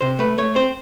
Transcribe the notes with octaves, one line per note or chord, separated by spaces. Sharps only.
C3 C5
A3 B4
A3 C#5
C4 C5